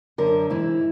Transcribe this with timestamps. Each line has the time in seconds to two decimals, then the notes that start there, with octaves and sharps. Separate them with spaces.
0.18 F#2 D3 A#4
0.50 G#2 E3 E4